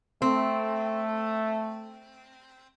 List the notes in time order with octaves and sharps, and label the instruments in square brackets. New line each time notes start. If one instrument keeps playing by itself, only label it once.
[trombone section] A3 [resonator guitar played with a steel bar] C4